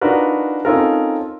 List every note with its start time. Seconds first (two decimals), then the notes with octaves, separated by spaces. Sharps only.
0.01 D4 D#4 F4 F#4 A#4 B4
0.65 C4 C#4 D#4 F4 A4 A#4